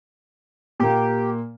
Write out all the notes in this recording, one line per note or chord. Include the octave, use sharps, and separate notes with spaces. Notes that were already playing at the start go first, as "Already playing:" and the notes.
A#2 A#3 G4